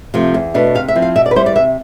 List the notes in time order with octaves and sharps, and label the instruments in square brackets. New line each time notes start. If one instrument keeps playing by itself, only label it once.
[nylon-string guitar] C3 F3 A3
E2
B2 A3 D4
C3 F5
E5
F3 C4 E4
F5
B2 E5
D5
B4
G3 B3 E4 C5
D5
C3 E5